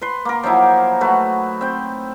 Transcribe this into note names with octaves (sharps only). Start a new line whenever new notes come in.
B4 C6
A#3 A#4
F3 F#3 D#4 E4
A3 F#4 B4
C4 G5